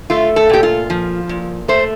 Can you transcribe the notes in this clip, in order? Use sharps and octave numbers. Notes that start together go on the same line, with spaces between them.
A3 F4
A4
A#2 G4
F4
F3
A#2
A3 C5